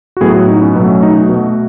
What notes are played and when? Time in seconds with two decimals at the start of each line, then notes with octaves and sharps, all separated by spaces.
0.17 F#4
0.21 A2 F#3 B3 G#4
0.35 F#4
0.48 D#4
0.62 C#4
0.76 B2 F#3 A3
0.89 C#4
1.03 D#4
1.16 F#4
1.29 B2 A3